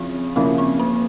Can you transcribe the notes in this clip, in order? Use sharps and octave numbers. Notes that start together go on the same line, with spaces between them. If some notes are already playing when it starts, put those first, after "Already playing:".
Already playing: C#3 F3 C4 E4
C#3 F3 A#3 C#4 E4
C4
A#3